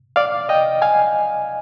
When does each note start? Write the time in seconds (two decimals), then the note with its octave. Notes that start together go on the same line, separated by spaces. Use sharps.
0.16 D5 F5
0.49 D#5 G5
0.82 F5 G#5